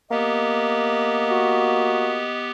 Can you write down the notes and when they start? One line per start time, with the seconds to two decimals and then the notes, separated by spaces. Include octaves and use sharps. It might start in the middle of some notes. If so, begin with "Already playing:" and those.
0.11 A#3 B3 G4 D#5
1.29 F#4